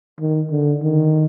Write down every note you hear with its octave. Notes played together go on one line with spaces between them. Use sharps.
D#3
D3
D#3